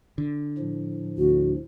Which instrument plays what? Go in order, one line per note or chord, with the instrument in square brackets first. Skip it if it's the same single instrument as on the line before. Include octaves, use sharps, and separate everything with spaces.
[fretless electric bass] D3
[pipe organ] A2 F3
[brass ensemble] D2 [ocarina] F#4